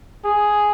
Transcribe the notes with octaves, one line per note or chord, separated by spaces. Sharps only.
G#4